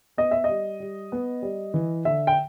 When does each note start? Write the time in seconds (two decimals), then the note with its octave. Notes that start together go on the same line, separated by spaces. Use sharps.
0.17 B3 D#5
0.31 E5
0.44 G3 D#5
0.80 G3
1.12 B3
1.42 G3
1.74 E3
2.05 D3 E5
2.27 G5